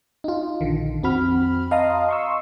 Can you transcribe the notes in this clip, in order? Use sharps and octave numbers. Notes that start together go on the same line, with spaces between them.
D#4 F4
A#1 D3 D#3
F2 C4 F#4 B5 F6
D#5 F5 A5 A#5 C6 D#6
C6 C#6 E6